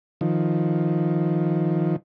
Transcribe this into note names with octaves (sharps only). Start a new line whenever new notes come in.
D#3 F3